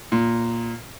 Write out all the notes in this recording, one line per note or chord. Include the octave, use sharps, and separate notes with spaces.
A#2